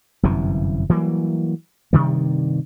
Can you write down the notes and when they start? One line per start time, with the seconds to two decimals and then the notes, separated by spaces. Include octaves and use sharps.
0.23 G1 F#2 C3 E3
0.89 E3 F#3 G3 A#3
1.93 G2 C3 D#3 G3